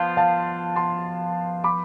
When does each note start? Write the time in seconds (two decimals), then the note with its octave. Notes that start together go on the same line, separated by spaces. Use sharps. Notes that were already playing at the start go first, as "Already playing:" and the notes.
Already playing: F3 B3 F4 C5 F5 A5
0.17 F5 A5
0.76 A5 C6
1.64 B5 D6